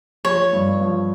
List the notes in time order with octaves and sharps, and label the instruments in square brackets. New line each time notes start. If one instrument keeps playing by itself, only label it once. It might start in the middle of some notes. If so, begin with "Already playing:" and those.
[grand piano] F3 [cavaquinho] C#5
[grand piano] G2
F3